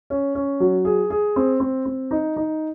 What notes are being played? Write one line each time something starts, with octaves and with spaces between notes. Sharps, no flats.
C#4
C#4
F#3
G#4
G#4
C4
C4
C4
D#4
D#4